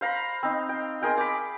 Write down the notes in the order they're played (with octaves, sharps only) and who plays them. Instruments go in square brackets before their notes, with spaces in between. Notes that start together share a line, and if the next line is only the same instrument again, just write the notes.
[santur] C5 F5 A#5 B5
C4 D#4
G5
G#4 A#4 G5 C6
B5 D6